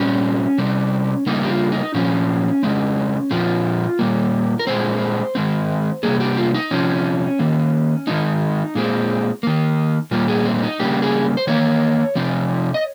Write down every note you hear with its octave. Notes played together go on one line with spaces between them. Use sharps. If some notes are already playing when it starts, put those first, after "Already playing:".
Already playing: A#2 G3 C4 C#4
C3 G3 C4
C#3 G3 A#3 D#4
G4
F4
D#4
A#2 F3 C4 C#4
C#3 G#3 C4
A#2 F3 C4 F4
A#2 G3 A#3
A#4
A#2 G#3 C4 C5
D#3 G#3 C4
C3 G3 A#3 G#4
G4
F4
D#4
C3 F3 C4 C#4
D#3 A#3
D#3 G#3 C4 D#4
A#2 G#3 C4
D#3 A#3
A#2 G3 A#3 F4
G#4
C4
D#4
C#3 G3 A#3 G4
G#4
C5
D#3 A#3 C#5
C3 F3 C4
D#5